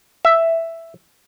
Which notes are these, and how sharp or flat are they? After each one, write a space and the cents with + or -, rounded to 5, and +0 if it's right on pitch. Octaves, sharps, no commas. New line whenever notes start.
E5 +5